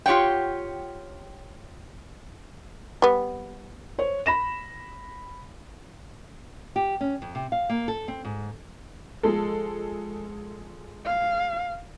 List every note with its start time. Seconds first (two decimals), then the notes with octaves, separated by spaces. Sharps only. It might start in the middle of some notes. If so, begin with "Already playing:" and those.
0.06 F4 G4 C#5 F#5 G5
3.02 G3 B3
3.98 C5 C#5
4.26 B5 A#6 E7
6.76 G4
7.01 C#4
7.22 F2
7.35 C3
7.52 F5
7.69 A#3
7.88 A4
8.08 C4
8.25 G#2
9.23 F3 G#3 A4
11.06 F5